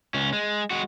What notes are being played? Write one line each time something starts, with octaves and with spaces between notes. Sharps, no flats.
C#2 C#4
G#3
G#3 F#4